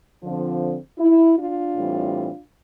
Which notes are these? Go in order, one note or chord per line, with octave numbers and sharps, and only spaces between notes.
D3 F3 C4
E4
D4 F4
A2 E3 G3 C4